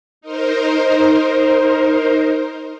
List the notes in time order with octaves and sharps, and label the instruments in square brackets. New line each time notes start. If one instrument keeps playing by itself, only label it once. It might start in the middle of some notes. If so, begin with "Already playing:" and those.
[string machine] D#4 A#4 C5